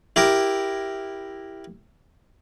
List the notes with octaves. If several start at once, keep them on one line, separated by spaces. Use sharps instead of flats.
E4 G4 A#4